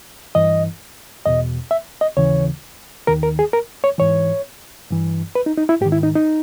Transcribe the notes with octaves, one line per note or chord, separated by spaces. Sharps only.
G2 E3 D#5
E2 B2 D#5
E5
D#5
D#2 C#3 E3 C#5
D#2 D#3 A#4
A#4
G#4
A#4
C#5
G#2 E3 C#5
G2 E3
B4
D#4
D#4
E4
G#2 G4
D#3
E4
D#4
D#4